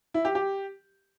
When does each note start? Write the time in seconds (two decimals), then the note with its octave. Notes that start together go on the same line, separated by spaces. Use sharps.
0.14 E4
0.25 G4
0.35 G4